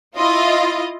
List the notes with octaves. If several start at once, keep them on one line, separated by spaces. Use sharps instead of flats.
E4 F4 D#5